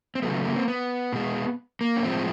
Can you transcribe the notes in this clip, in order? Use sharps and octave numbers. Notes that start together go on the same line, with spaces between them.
C4
C#3 F#3 A3 B3
A#3
C4
B3
B2 G#3
A#3
C#4
A2 F3 G#3 C4